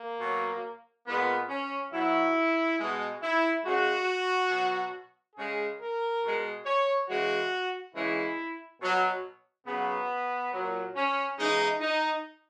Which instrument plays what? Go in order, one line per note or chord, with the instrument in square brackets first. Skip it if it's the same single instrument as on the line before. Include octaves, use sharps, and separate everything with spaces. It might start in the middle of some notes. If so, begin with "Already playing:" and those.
Already playing: [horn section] A#3
B2 F#3
A#2 G#3 B3
C#4
B2 F#3 E4
B2 G#3
E4
C#3 G#3 F#4
B2 F#3
C#3 G#3 G#4
A#4
B2 G#3
C#5
C#3 E3 G#3 F#4
C#3 E3 G#3 E4
B2 F#3
C#3 F#3 B3
A#2 F#3
C#4
C#3 E3 G#3 D#4
D#4